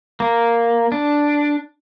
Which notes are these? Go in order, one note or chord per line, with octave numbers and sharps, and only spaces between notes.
A#3
D4